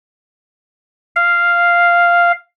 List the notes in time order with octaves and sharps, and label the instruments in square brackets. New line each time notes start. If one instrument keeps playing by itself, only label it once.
[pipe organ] F5